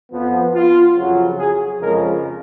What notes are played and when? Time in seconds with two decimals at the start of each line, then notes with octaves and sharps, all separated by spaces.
0.12 F2 F3 B3
0.54 F4
0.96 F2 C#3 F#3
1.38 G#4
1.81 F2 C#3 F3 G#3 A#4